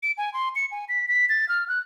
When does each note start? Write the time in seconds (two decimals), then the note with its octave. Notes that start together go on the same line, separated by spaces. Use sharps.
0.03 D7
0.18 G#5
0.34 C6
0.56 C#7
0.71 G#5
0.89 B6
1.08 B6
1.29 A6
1.49 F6
1.68 F#6